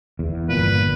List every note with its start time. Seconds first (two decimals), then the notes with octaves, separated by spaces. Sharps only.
0.19 E2
0.49 G1 A#2 B4